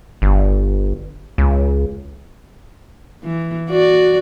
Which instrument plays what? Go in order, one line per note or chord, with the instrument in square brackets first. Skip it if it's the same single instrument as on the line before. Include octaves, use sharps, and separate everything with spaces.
[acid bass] G1
C#2
[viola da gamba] E3
F#4 D5